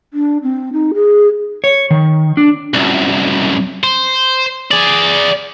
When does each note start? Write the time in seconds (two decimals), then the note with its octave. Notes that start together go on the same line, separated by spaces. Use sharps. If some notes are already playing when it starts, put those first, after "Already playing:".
0.14 D4
0.43 C4
0.73 D#4
0.94 G#4
1.64 C#5
1.91 D#3
2.37 D4
2.74 C2 F#2
3.84 C5
4.71 G#4 D5